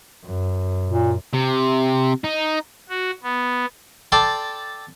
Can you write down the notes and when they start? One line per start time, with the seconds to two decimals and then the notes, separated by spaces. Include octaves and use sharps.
0.25 F#2
0.88 A#2
1.33 C3
2.24 D#4
2.89 F#4
3.23 B3
4.12 A4 D5 G5 A5 C6